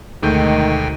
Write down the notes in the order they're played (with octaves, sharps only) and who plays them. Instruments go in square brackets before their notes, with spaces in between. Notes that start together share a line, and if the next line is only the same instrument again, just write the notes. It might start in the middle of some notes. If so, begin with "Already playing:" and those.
[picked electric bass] D2 [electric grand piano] G#2 A3 G6 [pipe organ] B2 G5 G#5 [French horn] D#3